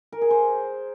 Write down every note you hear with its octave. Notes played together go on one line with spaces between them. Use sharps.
A#4
G#4
C5